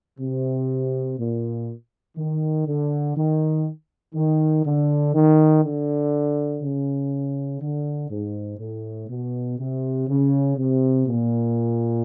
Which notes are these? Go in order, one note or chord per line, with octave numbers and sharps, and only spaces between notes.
C3
A#2
D#3
D3
D#3
D#3
D3
D#3
D3
C#3
D3
G#2
A2
B2
C3
C#3
C3
A#2